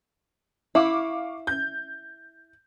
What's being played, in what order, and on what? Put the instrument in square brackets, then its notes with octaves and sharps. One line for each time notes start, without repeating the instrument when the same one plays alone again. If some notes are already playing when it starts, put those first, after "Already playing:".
[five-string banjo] E4 [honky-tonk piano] F5 C#6 D6
[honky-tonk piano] G6